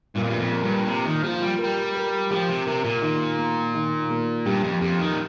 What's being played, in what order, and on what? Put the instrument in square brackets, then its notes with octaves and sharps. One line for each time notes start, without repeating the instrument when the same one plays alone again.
[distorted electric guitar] G2 [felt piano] A#2
[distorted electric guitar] F2
G2
F2
[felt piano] A#3
[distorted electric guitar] G2
[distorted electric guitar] C3 [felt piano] A#3
[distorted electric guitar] D#3
[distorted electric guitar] F3 [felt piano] F4
[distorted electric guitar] G3
[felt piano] A#4
[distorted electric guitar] G3
[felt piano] A#4
[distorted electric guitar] F3 [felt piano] G4
[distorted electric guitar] C3
[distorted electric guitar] C3 [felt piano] A#4
[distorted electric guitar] A#2
[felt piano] D#3
A#3
D#3
A#3
[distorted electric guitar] G2 [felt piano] G4
[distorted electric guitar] F2
[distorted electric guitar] F2 [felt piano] G4
[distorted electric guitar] D#3
A#2